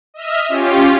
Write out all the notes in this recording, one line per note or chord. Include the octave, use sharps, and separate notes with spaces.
D#5 E5 F6
C#4 F4 G4